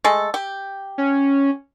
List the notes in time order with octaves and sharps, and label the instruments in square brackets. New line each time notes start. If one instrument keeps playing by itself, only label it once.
[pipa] G#3 A3 A4
G4
[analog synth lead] C#4